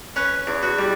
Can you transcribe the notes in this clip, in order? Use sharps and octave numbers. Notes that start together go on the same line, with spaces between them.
C#4 B4
E2
F#4
G3